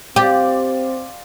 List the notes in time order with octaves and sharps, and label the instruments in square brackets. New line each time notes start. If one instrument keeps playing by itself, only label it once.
[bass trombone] C4 [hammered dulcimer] F4 D5 [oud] G4